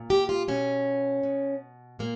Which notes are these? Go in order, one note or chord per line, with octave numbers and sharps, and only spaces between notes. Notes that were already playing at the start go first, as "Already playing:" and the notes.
Already playing: A#2
G4
F4
B2 C#4
B2
A#2 A#3